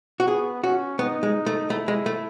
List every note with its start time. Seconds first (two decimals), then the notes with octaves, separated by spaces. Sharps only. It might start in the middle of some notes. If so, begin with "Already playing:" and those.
0.20 F#4
0.28 B3 G#4
0.64 C#4 F#4
0.99 B3 D#4
1.23 G#3
1.46 A3
1.70 A3 E4
1.88 G#3
2.06 A3